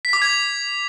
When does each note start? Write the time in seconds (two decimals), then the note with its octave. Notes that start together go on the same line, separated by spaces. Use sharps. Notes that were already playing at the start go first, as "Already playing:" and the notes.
0.05 B6
0.13 D6
0.22 G#6